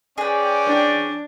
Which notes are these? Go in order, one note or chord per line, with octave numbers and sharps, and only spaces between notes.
C#4 G#4 B4 D5 G5
D4